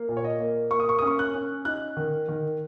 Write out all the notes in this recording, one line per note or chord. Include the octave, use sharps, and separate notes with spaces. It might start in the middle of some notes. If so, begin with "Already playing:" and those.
Already playing: A#3
A#2
C#5
D#5
A#3
A#3 C#6
D#6
C#6
C#4 D#6
C#6
F#6
C#4
D#4 F#6
D#3
D#3